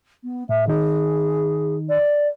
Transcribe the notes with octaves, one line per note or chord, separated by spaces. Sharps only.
B3
A2 E5
D#3 D#4 G#4
D5